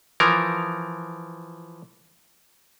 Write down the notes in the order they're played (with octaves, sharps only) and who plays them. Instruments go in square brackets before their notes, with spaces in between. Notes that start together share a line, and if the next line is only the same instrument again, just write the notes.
[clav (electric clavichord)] E3 F3 A#4